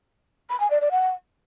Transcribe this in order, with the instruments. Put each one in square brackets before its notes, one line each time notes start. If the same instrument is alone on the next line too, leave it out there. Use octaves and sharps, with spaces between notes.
[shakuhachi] B5
G#5
D5
D5
F#5